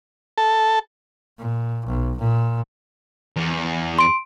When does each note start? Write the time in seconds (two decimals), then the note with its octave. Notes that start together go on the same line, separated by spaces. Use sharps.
0.38 A4
1.38 A#2
1.86 B1
2.19 A#2
3.36 E2
3.99 C6 D7